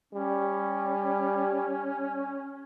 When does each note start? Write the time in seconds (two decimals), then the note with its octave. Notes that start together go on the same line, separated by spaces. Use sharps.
0.13 G3 C#4